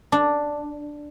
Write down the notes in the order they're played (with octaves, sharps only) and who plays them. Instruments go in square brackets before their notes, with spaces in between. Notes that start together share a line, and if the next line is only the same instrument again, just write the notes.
[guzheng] D4